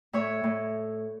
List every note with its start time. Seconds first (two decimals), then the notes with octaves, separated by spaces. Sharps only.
0.13 A2 C#5 E5
0.44 A2